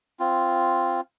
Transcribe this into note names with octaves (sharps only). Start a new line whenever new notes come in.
C4 F4